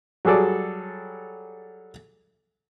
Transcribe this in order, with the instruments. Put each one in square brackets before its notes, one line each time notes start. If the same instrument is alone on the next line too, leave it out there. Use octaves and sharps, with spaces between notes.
[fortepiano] F#3 G3 G#4 A4 D5